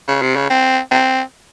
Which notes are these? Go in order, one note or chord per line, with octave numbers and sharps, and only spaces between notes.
C#3
C3
C#3
C4
C4